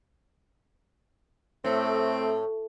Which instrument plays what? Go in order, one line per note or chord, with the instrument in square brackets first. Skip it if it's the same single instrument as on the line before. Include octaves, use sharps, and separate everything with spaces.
[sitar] A2 [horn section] A3 C4